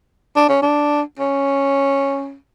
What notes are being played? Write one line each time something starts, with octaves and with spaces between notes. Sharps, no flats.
D4
C#4
D4
C#4